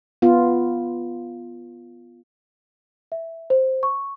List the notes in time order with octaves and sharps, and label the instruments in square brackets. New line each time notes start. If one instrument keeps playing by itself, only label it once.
[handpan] B3 F4
[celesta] E5
C5
C#6